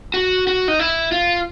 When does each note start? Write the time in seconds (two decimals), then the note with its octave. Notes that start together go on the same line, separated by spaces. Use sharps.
0.14 F#4
0.47 F#4
0.68 D#4
0.79 E4
1.12 F4